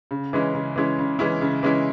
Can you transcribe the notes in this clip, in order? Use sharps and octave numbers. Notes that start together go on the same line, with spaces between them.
C#3
E3 G#3 C#4 E4
C#3
E3 G#3 C#4 E4
C#3
E3 G#3 C#4 E4
C#3
E3 G#3 C#4 E4